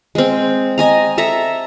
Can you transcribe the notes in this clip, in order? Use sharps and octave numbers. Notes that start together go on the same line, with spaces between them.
G#3 C4
D#5 G#5 A#5
A4 E5 A#5